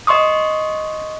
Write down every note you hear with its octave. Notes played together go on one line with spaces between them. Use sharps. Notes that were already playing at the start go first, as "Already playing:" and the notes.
D#5 C6 C#6 D#6